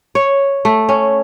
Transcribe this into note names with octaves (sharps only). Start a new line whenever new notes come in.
C#5
A3
C#4